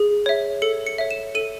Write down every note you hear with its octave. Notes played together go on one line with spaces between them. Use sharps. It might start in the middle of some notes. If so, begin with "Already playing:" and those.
Already playing: G#4
C#5 E5
A4 C#7
C#7
C#5 E5
E7
A4 D#7